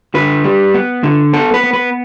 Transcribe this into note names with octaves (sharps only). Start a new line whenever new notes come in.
D3 B4
G3
B3
D3
B3 A4
B4
B3
B4